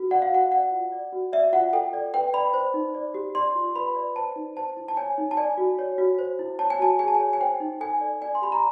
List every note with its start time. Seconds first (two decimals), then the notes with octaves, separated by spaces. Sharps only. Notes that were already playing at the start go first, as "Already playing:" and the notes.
Already playing: F#4
0.11 D5 F#5
0.22 F5
0.31 F#4 F#5
0.51 D5 F#5
0.71 F4
0.92 D5
1.13 F#4
1.33 D5 E5
1.53 F4 F#5
1.73 A4 G5
1.93 D5
2.14 B4 G5
2.33 D5 B5
2.54 C5
2.74 D#4
2.94 D5
3.14 G4
3.35 D5 C6
3.55 F4
3.76 B4 B5
3.96 D5
4.16 C5 A5
4.36 D#4
4.56 C5 A5
4.77 E4
4.88 A5
4.97 C#5 G#5
5.18 D#4
5.31 A5
5.37 D5 G#5
5.57 F#4
5.79 C#5
5.98 F#4
6.19 C5
6.39 E4
6.59 C#5 A5
6.70 G#5
6.79 F#4 A5
6.99 G#4 G#5
7.08 A5
7.15 G#5
7.20 C#5
7.33 G#5
7.40 C5 G5
7.60 D#4
7.80 A4 G#5
8.01 D5
8.21 D5 G#5
8.35 C6
8.42 G4 B5
8.52 A#5